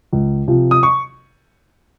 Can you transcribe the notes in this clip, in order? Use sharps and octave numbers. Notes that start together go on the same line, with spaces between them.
C#2
C3 F3
D#6
C#6